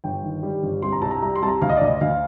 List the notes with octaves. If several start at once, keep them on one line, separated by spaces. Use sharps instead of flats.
G1 G5
D#3
G3
G1
C2 C6
A#5
C2 A5
A#5
G3 A#5
C6
C2 A5
A#5
D2 F5
D#5
D5
D2 D#5
D2 F5